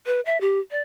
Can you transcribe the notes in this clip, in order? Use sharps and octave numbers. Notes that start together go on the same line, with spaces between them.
B4
E5
G4
D5